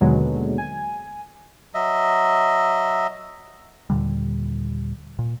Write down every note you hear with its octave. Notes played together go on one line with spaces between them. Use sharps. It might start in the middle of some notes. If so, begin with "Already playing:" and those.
D#2 B2 D3 F#3 G#3
G#5
F#3 D#5 E5
D#2 A#2 D3 G3
A#2